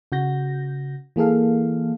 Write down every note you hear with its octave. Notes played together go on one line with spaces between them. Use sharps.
C#3 F#4 G6 A#6
E3 A#3 G#4 A4 F5